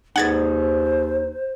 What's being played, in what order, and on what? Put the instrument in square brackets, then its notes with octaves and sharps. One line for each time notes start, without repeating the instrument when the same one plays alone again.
[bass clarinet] D#2 [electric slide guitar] D#4 G#4 B4 [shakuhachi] C5 [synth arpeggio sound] F#5 G#6 A6